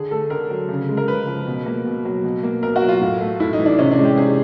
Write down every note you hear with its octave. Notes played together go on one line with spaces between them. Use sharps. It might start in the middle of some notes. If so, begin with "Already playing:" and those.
Already playing: D3 G#4
A3 A4
D3 A#4
F#3
C#3
G#3
A#4
C#3 B4
F3
B2
A#3
B2
F#3
B2
A#3
B2 A#4
F#4
F#3
F4
A2
A3
A2 E4
D#4
E3
D4
C3 C#4
D4
G#3
G4
C3 G#4